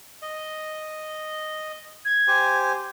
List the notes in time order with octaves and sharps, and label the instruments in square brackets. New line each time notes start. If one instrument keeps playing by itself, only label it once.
[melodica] D#5
[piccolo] G#6
[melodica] G4 C5 G#5